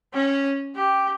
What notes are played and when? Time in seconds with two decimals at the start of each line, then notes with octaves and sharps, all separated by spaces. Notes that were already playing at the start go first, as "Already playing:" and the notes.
0.13 C#4
0.75 G4